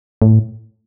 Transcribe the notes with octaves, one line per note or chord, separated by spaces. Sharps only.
A2